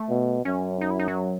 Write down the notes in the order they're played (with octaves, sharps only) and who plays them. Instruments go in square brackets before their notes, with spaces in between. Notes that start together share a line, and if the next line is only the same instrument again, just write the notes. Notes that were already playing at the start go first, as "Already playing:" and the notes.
Already playing: [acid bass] A3
[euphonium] B2
[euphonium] F#2 [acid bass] C#4
[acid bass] D#4
E4
D#4
F#3